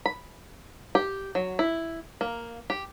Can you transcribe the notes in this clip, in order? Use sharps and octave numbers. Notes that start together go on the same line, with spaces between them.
B5
G4
F#3
E4
A#3
G4